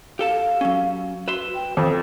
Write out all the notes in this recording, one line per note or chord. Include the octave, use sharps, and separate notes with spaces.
G4 A4 F5 A5
F#3 C#4
F#4 B4 E5 C6
G5
F2 A4